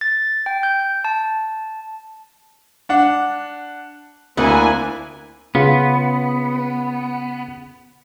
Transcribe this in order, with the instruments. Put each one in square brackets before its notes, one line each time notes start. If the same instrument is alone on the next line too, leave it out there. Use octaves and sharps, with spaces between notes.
[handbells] A6
G5
G6
A5
[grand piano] D4 F#5
[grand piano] D2 [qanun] A#3 D4 F#5 [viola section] C4 E4 G#5
[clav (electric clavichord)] C#3 F4 [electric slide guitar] B3